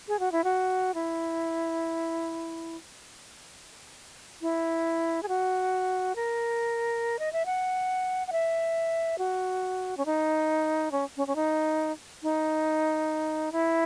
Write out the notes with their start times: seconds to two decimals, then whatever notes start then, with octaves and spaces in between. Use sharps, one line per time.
0.08 G#4
0.20 F#4
0.32 E4
0.44 F#4
0.94 E4
4.42 E4
5.23 G#4
5.28 F#4
6.16 A#4
7.19 D#5
7.33 E5
7.46 F#5
8.27 F#5
8.32 E5
9.18 F#4
9.97 C#4
10.06 D#4
10.92 C#4
11.17 C#4
11.27 C#4
11.36 D#4
12.23 D#4
13.52 E4